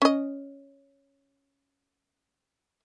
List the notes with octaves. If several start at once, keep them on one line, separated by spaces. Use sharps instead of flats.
C#4 D#5